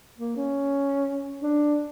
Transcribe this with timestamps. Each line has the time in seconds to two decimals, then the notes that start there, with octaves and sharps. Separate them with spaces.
0.18 A#3
0.37 C#4
1.42 D4